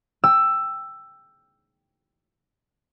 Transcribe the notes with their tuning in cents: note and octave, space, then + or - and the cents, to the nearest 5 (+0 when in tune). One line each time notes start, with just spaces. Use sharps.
G5 +5 E6 +10